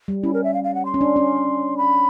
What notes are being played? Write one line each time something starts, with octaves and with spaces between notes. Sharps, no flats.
G3
C#4 E4
A#4
E5
F5
F5
F#5
C6
C#4
D4
C#4
B5